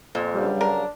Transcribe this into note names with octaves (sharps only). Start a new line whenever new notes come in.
F2 A#2
G2 C#3 F#3 G3
D4 A#4